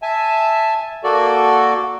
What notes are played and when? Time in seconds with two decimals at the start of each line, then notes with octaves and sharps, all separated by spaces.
0.02 E5 G#5 A5
1.04 A#3 F#4 A4 D5